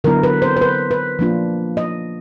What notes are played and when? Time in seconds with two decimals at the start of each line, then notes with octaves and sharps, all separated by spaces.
0.04 D3 F#3 B3 E4 A#4
0.23 B4
0.42 C5
0.57 C5
0.62 B4
0.91 B4
1.19 F3 A#3 D4 F4
1.77 D#5